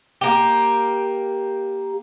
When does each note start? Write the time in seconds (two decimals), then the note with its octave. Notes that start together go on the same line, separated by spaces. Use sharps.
0.21 A#3 G4